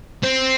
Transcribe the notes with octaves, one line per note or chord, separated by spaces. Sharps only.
C4